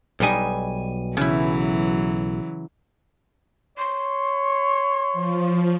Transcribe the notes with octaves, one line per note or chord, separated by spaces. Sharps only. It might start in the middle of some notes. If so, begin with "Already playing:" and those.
B1 B2 G3 D#4 G#5
C#3 E3 F#3 E4
C#5 C6
F3